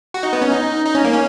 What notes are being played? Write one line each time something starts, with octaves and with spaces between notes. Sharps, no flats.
F#4
D#4
B3
C#4
D#4
D#4
C#4
A#3
C#4